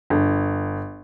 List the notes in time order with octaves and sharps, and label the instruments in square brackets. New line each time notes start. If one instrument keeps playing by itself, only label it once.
[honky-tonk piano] G1